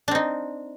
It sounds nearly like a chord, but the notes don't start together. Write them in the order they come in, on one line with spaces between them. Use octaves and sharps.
D4 C4 D#4